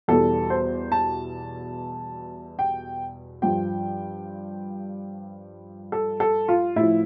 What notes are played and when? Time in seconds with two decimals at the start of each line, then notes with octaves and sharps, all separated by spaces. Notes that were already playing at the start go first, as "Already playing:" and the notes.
0.08 E2 B2 G3 A4
0.50 C5
0.92 A5
2.59 G5
3.42 G2 F3 G5
5.92 A4
6.20 A4
6.48 F4
6.76 A2 F3 E4